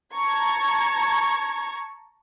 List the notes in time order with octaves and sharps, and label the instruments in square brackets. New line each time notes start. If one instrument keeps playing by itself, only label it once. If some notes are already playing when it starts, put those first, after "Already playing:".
[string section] A5 A#5 C#6 G#6